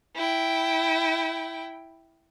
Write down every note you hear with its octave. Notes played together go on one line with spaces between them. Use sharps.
E4 G5